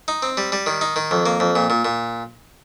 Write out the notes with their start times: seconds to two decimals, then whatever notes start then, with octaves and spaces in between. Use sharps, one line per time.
0.08 D#4
0.23 C4
0.37 G3
0.52 G3
0.66 D#3
0.81 D#4
0.96 D#3
1.11 F2
1.26 A#3
1.40 F2
1.56 A#2
1.70 A#2
1.85 A#2